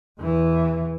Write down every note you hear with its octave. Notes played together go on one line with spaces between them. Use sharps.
E2 E3